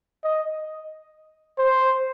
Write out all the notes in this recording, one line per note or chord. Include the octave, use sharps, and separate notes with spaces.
D#5
C5